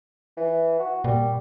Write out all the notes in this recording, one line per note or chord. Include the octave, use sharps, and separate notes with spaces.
E3
F#4
A#2 G3